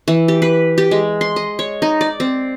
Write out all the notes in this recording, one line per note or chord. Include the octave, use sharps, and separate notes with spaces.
E3
G4
B4
G4
G#3
C6
D#5
C#5
D#4
D5
C4